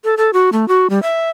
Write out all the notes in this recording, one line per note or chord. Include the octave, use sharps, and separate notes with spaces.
A4
A4
F#4
A3
F#4
G3
E5